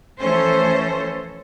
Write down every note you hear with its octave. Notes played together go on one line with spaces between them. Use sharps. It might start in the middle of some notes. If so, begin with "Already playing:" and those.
E3 F3 A3 C#4 A4 C5